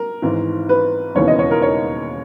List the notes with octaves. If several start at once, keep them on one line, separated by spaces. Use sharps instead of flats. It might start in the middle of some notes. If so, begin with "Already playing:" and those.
Already playing: A#4
G#1 G#2 E3
B4
E1 D#2 C#3 E3 C#5
D#5
C#5
A#4
C#5